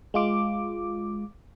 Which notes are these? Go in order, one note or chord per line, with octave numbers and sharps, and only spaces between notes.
G#3 F4 D6